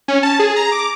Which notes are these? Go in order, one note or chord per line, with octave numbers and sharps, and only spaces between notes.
C#4
A5
G#4
A#5
D6